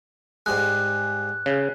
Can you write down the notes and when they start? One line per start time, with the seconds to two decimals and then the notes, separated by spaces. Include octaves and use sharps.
0.46 G#2 G3 G#3 F#6
1.46 C#3